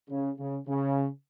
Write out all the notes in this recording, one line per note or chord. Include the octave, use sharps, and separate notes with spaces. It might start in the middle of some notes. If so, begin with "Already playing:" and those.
C#3
C#3
C#3